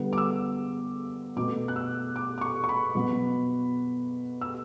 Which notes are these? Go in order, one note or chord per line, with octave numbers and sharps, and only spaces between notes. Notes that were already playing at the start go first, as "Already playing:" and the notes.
Already playing: D3 G3 B3
D6
E6
B2 A3 D6
F#6
E6
D6
D6
C#6
C#6
B5
B2 F#3 B3
E6